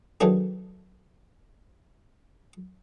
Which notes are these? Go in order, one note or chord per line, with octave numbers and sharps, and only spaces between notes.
D#3 E3 F#3 A3 D4 G#4